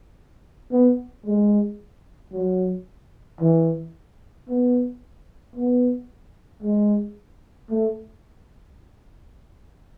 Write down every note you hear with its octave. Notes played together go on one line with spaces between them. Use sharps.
B3
G#3
F#3
E3
B3
B3
G#3
A3